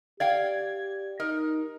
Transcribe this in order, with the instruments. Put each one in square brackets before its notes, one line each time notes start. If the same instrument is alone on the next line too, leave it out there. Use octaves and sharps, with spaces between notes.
[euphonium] G4 [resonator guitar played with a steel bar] D5 F5 G5 [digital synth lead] G#6
[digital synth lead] D#4 [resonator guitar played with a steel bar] A#4